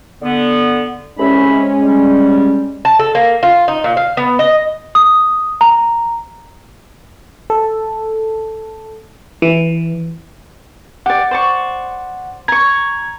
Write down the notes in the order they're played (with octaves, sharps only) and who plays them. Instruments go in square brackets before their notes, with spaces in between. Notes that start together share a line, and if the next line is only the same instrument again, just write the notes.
[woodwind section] D3 B3
[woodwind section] C2 E5 B5 [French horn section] G#3 C#4
[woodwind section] G3
[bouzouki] A5
A4
A#3
F4
D#4
A#2
F5
B3
D#5
[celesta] D#6
A#5
[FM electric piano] A4
E3
[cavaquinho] G4 D5 [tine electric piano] F#5
[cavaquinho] C5 D5 C#6
[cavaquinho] A#5 C#6 [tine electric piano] G#6